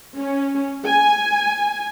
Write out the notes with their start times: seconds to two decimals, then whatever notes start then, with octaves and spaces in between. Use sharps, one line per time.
0.19 C#4
0.85 G#5